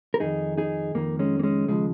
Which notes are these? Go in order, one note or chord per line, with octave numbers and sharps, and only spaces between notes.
A#4
F2 D#3 D#4 G#4
D#4 G#4
F2 D#3 A#3
G#3 C#4
A#3
G#3 C#4
D#2 C#3 F3 G#3